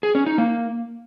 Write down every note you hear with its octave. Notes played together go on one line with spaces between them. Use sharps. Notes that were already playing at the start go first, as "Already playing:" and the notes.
G#4
C#4
D#4
A#3